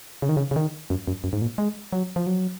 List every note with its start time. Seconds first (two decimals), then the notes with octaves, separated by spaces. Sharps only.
0.22 C#3
0.29 D#3
0.37 C#3
0.51 C#3
0.56 D#3
0.90 F#2
1.07 F#2
1.24 F#2
1.33 G#2
1.42 A#2
1.58 G#3
1.93 F#3
2.16 F3
2.27 F#3